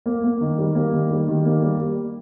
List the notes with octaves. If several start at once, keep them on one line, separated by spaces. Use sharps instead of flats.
A#3
A#3
D#3
G3
A#3
D#3
G3
D#3
A#3
G3